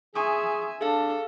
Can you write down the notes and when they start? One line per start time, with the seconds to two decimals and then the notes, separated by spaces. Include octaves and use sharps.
0.15 G#4 E5 G#5 C6 C#6 D#6
0.81 D4 G#4 A4 F5